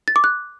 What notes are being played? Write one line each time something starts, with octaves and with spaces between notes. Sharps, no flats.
A6
D6
F#6